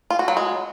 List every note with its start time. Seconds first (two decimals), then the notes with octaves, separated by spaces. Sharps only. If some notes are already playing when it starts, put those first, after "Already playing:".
0.10 F4
0.19 F#4
0.28 F#3
0.37 G#3